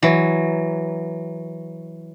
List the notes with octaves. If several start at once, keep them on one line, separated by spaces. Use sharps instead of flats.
E3 F#3